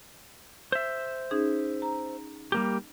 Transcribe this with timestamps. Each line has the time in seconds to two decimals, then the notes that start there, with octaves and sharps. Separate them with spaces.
0.72 C5 E5
1.31 C#4 D#4 G#4
1.82 A#5
2.52 G3 A#3 G4